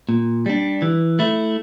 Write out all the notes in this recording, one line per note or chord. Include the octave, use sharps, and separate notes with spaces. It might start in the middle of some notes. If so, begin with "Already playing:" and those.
A#2
G3 D4
E3
A3 E4